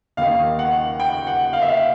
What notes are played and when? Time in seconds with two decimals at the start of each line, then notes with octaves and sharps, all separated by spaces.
0.17 D#2 D#3 F5
0.59 F#5
1.00 G5
1.27 F#5
1.53 F5
1.62 E5
1.69 F5